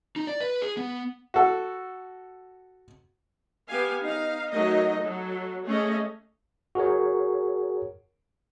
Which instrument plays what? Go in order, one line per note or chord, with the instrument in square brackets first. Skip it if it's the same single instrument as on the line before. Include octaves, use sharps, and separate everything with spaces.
[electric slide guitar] D#4
D5
B4
G#4
B3
[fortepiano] F#4 A4
[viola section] B3 G4 F5 G#5
D#4 F5
F#3 A3 D#4 A#4 D#5
F#3 A4
A3 C#4 G#4 D#5
[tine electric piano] F#4 G#4 A#4 C#5